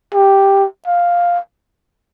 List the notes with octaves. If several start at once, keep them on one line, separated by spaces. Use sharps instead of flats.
G4
F5